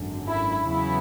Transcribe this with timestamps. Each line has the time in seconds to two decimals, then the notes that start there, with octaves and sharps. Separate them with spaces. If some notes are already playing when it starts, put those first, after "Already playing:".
Already playing: G#1 F#2 D3
0.26 E4
0.66 E2 C#3 F#3 B3 E4